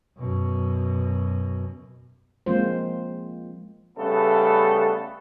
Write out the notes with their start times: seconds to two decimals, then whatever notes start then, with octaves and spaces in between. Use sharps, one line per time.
0.18 F#2 B2
2.46 F3 G#3 A#3 C4 F4 C5
3.97 C#3 G3 A3 B3 A4 B4